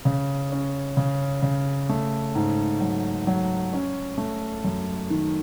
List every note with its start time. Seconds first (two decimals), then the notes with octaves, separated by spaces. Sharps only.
0.05 C#3
0.52 C#4
0.97 C#3
1.42 C#3
1.89 A3
2.35 G#2
2.81 F#3
3.27 F#3
3.73 C#4
4.18 A3
4.64 F#2
5.10 D#3